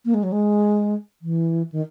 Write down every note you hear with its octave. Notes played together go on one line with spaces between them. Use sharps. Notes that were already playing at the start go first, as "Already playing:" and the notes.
A#3
G#3
F#3
G#3
E3
D#3